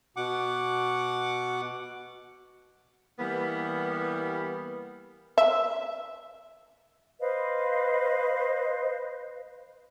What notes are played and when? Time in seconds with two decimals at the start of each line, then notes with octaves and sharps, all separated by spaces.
0.16 B2 F#5 D6
3.19 E3 G3 A#3 B3
5.38 E5
7.20 B4 C5 D#5 F5